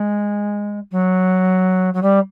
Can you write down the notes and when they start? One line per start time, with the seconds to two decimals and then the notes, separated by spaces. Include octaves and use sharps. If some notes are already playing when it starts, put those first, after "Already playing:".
Already playing: G#3
0.91 F#3
1.94 F#3
2.02 G3